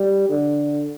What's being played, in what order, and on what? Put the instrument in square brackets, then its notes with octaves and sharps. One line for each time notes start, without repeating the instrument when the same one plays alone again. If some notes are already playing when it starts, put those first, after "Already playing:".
Already playing: [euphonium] G3
D3